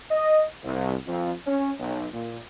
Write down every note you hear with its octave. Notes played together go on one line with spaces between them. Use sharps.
D#5
C2
F2
C#4
B1
A#2